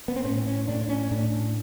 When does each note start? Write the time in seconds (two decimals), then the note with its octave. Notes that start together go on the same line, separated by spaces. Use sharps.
0.08 B3
0.16 C4
0.24 A2 C#4
0.47 C#4
0.68 A2 D4
0.89 C#4
1.11 A2 D4